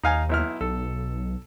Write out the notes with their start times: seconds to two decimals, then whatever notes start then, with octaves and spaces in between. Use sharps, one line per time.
0.03 D#2 D#4 F5 G#5
0.29 B1 E4 F6
0.61 B1 A4